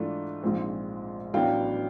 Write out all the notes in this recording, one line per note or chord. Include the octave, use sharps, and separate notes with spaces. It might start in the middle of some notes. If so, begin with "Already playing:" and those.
Already playing: G#2 E3 A3 D4 F4
A#1 G#2 F3 G#3 C4
A1 A2 F#3 B3 D4 F5 G5